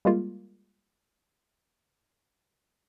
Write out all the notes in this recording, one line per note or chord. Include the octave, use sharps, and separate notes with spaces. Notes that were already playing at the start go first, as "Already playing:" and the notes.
G3 G#3 A#3 F4